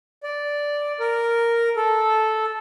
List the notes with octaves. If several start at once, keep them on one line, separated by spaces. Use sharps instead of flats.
D5
A#4
A4